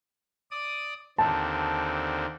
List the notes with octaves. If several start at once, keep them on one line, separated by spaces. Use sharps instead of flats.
D5 D#6
D#2 D3 C4 A5